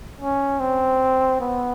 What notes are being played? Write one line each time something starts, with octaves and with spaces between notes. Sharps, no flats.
C#4
C4
B3